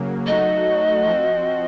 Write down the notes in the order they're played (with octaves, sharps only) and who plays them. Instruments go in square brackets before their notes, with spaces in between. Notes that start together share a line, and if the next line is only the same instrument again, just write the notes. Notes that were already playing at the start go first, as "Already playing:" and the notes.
Already playing: [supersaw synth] C#3 F#3 A#3
[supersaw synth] F#3 A3 D#4 F#4 [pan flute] D#5
[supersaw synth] F3 C4 F#4